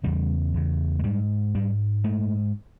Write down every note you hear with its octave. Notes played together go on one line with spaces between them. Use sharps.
E2 C#3 G3
E2 C#3
G#3
G#2 G3
G#2 G3
G#2 A3